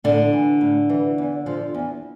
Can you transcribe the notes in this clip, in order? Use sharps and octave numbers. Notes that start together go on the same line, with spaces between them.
A2 D3 D4
E3
A2
E3
E2
D3 F3
E2